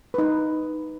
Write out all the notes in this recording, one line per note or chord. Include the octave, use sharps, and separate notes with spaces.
D#4 B4